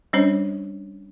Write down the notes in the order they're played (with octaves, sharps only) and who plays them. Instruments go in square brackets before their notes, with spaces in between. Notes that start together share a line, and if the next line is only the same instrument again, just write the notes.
[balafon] G3 C#4 D4 C5 C#5 D#5